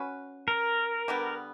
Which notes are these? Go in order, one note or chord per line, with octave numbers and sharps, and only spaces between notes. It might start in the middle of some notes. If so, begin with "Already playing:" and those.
Already playing: C#4 F#4 B4
A#4
D3 G3 B3